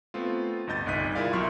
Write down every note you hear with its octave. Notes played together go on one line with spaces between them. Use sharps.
A3 B3 C4 F4
D2 G2 D#5 G6 A6
G1 C2 D#4 F#6 B6 D#7
E4 F4 G#4 A#4 D5 F5
B1 F#3 E5 C6 C#6 F6